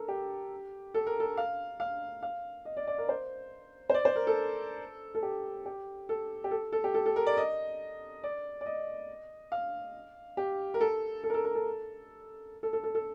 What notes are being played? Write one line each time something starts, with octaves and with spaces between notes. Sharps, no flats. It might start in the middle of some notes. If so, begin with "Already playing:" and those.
Already playing: A4 A#4
G4
A4
A#4
A4
F5
F5
F5
D#5
D5
D5
A#4
C5
C5
D5
C5
A#4
A4
A4
G4
G4
A4
G4
A4
A4
G4
A4
A4
A#4
D5
D#5
D5
D5
D#5
F5
G4
A#4
A4
A4
A#4
A4
A#4
A4
A4
A4
A4
A4